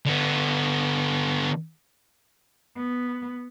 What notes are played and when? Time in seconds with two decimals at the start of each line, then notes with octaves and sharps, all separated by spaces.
0.05 D3 B3
2.76 B3